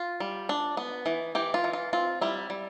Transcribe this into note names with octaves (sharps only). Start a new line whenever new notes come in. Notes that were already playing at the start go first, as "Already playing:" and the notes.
Already playing: F4
G3
D4
B3
E3
E3 G4
F4
E3
F4
C4 F4
G3 E4
G3